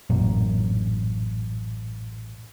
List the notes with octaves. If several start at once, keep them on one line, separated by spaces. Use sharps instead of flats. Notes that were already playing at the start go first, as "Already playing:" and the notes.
A1 F#2 A#2